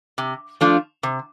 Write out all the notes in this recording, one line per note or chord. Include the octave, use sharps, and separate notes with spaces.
C3
F3 A3 D4 F4
C3